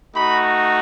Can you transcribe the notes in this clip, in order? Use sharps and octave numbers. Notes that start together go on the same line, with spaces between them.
A3 D#4 F#4 B5